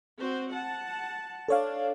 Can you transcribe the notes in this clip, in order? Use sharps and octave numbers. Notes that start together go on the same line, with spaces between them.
C4 F#4 C5
F#5 A5
D4 A4 C#5 F5